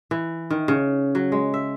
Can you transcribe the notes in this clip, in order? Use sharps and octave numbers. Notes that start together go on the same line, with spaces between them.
E3
D#3
C#3
F#3
G#3
E5